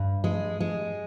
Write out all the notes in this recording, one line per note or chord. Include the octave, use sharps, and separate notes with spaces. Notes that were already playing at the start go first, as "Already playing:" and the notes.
Already playing: G2
G#3
G#3